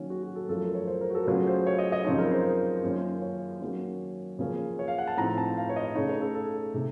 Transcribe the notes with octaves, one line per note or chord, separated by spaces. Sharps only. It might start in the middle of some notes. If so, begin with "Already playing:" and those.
Already playing: D#3 F#3 A#3 C#4
F#4
F#4
A4
F#2 F3 A3 A4
A#4
C#5
C5
A#4
F#4
A4
C#3 F#3 A3 C#4 F4
C5
C#5
D#5
D#5
F#2 C#3 F3 C4 D#4 C#5
A#4
C5
F#2 D#3 A#3 C#4 F4
C#5
D#3 F#3 A#3 C#4
C#3 F3 A#3 C#4
C#5
F5
F#5
A5
A2 F3 C4 D#4 A#5
A5
F5
C#5
D#5
C#3 A3 D#4 C#5
C#5
A4
A4
C3 D#3 A3